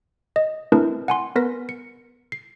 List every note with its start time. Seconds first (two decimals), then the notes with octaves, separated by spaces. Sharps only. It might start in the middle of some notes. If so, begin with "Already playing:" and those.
0.36 D#5
0.72 A3 C4 D4 E4 A#4 B4
1.08 F#5 G#5 C6
1.36 B3 A#4 B4 A#6 B6
1.69 C#7
2.32 C7